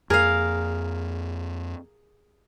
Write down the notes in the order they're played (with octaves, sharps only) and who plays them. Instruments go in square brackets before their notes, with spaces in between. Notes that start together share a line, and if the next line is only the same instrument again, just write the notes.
[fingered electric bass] F2 A#3 [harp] G#4 [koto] A#4 F5